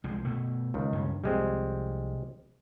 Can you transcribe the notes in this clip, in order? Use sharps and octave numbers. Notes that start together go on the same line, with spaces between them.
C2 F3 G#3
B2 A3
C#2 D#3
G2 C#3
C2 F3 G3 G#3 C4